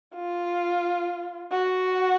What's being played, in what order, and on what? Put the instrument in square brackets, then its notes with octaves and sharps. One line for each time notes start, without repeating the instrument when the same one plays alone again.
[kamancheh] F4
F#4